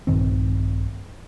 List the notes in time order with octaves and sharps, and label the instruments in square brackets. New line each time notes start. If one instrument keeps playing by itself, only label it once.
[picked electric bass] A#1 G2 D#3 C4